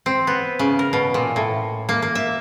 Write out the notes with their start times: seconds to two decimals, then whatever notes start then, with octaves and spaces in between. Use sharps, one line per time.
0.06 C4
0.27 B3
0.59 C#3
0.79 A#4
0.93 B2
1.14 A#2
1.36 A2
1.89 A#3
2.02 A#3
2.15 E5